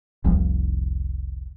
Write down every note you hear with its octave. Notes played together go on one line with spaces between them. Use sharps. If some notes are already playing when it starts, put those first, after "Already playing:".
F1 C2 F3